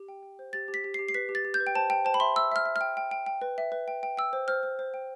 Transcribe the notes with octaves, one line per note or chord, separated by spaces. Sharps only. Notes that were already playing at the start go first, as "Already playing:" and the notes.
Already playing: G4
G5
G5
C5
G4 A6
G4
B6
G4
G4 C7
C7
B4 B6
G4
A6
G4
G6
B4
G5
C5 A5
G5
C5 A5
B5
E5 C6
E5 E6
E5 F6
E5
F6
G5
G5
G5
G5
B4
E5
B4
G5
G5
G5 E6
C5
C5 F6
C5
C5
G5